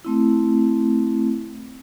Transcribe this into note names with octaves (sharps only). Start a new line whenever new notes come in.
A3 C4 E4